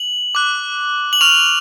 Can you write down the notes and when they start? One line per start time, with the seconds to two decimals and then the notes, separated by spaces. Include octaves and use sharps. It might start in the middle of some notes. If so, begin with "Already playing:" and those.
Already playing: F#7
0.35 D6 F#6
1.13 F#7
1.21 C#6 F6 F7